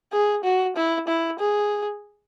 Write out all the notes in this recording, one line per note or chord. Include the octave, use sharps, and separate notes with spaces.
G#4
F#4
E4
E4
G#4